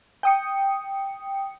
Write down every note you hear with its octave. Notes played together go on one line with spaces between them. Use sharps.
G5 D#6 C#7